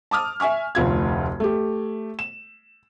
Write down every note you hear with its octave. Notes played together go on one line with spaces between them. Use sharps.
A5 D6 D#6 F6
E5 G#5 C#6 F6
F1 D2 F4 G#6
A3 G4
E7